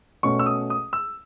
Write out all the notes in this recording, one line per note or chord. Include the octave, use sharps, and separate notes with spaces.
B2 A3 C#4 C#6
E6
D#6
D#6
E6